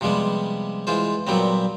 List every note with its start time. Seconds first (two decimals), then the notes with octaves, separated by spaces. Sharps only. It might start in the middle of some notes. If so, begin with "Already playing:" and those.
0.01 C3 F3 G3 G#3 B3
0.87 E3 G#3 F4 C5
1.27 A#2 F#3 G3 B3 C4